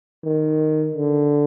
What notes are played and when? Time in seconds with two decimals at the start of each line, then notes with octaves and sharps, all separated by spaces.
0.25 D#3
0.95 D3